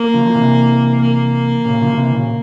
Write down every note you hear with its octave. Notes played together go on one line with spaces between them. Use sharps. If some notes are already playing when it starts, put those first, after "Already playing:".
Already playing: A#3
C#3 F3
F3
C3 E3
A#3
A#2 C#3
C#3 F3
F3
C3 E3
A#2 C#3